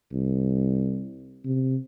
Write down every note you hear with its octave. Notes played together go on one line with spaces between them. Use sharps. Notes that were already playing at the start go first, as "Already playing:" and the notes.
C2
C3